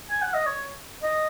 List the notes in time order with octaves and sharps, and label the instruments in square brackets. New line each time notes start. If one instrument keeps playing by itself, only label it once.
[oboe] G#5
F#5
D#5
C#5
D#5